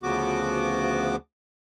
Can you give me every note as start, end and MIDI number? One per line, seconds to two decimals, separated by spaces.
0.03 1.16 38
0.03 1.16 49
0.03 1.16 53
0.03 1.16 59
0.03 1.16 66
0.03 1.16 86